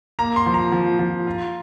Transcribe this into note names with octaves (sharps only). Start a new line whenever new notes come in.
A#3 A#5
C6
F3
A#5
F3
F3
F4